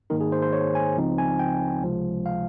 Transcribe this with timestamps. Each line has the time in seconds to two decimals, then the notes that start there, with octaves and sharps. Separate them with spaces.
0.10 G#2 D#3 A#3 D#4 A#4
0.21 G#4
0.32 C5
0.42 C5
0.53 C#5
0.75 G#5
0.97 C#2 C#3 F3 C4 D#4
1.18 G#5
1.39 G5
1.83 C#2 C3 F3 G#3
2.26 F5